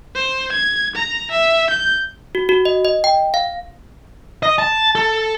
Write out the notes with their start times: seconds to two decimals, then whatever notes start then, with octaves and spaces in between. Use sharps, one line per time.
0.15 C5
0.52 G#6
0.96 A#5
1.31 E5
1.70 G6
2.35 F#4
2.49 F#4
2.65 D#5
2.85 D#5
3.04 G5
3.34 F5
4.43 D#5
4.58 A5
4.95 A4